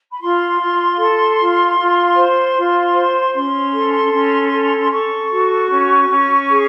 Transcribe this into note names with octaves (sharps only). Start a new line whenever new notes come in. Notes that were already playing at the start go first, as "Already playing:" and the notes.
B5
F4 C6
F4
A4
F4
F4
C5
F4
C5
C#4 C6
A4
C#4
A4
C6
A4 C#6
F#4
C#4
C#4
G#4